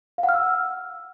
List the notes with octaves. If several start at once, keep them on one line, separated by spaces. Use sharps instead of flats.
F5
F#5
F6
E6